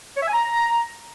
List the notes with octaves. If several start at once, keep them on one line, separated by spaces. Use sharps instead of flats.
C#5
E5
G#5
A#5